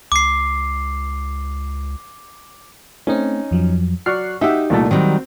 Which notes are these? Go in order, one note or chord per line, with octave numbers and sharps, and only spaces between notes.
C#2 D6 C7
A3 C4 C#4 D#4
F2 F3 F#3
F#3 D5 C#6 F6 F#6 C7
D#4 F#4 G4 E5 F#5 E6
C2 A#2 A3
D#3 F#3 G3 C4